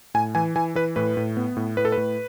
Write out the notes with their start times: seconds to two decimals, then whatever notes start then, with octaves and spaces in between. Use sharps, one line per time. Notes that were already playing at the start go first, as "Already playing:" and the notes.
0.14 A2 G#5
0.35 E3 G#5
0.56 E3 G#5
0.75 E3 B4
0.96 A2 B4
1.17 A2
1.37 B3
1.57 A2
1.77 A2 B4
1.85 A4
1.92 B4
1.97 A2